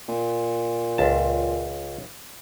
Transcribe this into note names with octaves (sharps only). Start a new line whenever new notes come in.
A#2
C#2 A5